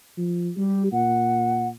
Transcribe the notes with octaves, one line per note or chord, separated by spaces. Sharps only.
F3
G3 G4
A#2 F#5